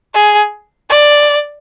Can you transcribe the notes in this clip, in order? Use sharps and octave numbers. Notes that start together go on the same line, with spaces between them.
G#4
D5